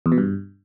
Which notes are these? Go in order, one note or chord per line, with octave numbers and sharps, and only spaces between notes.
E2
B2
G2